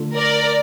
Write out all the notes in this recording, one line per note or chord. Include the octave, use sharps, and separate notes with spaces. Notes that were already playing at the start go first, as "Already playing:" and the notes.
Already playing: D3 A3 D4 F4 A4
A#4 D5